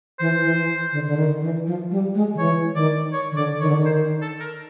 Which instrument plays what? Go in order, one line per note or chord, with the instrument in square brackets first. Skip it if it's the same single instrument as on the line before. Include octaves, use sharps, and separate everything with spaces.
[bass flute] E3 [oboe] C5
[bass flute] E3
D3
D3
D#3
E3
F3
G3
G#3
D#3
[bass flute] E3 [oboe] C#5
[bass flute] D#3 [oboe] D5
[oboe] C#5
[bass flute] D#3
[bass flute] D3 [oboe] D5
[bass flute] D#3 [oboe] C#5
[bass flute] D3
D#3
[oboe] C5
A4
A#4